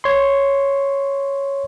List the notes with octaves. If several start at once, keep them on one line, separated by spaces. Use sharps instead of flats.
C#5 C6